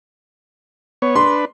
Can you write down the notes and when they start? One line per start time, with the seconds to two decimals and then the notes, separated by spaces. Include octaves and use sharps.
1.02 B3 C#5
1.15 D4 B4 C6